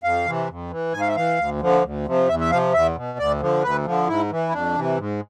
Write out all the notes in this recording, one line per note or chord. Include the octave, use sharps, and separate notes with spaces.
F2 F5
C3 E3
F2
E3
G#2 G#5
F5
E5
E3 F5
D2
D3 F3
D2
C3 F3
E2 E5
E5
C3 F3 F5
E2 E5
B2
D2 D5
D3 F3
D2 B4
D3 F3
G#2 E4
E3
E4
F2 D4
C3 E3
G#2